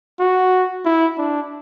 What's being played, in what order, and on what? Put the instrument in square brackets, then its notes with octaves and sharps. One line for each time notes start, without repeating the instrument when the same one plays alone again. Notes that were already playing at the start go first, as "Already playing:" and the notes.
[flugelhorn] F#4
E4
D4